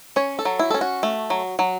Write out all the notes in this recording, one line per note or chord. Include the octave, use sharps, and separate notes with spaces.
C#4 C#5
A4
F#3
E4
C#4 A4
F#4
A3
F#3
F#3